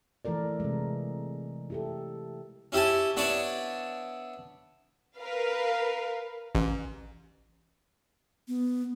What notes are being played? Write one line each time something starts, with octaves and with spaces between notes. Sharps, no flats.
E3 A3 A4 A#4 D5
C3 G#3
E4 G4 A4
C#4 E4 G4 G#5 A5
B3 D4 E4 C#5 D5 A5
A#4 B4 F5
A1
B3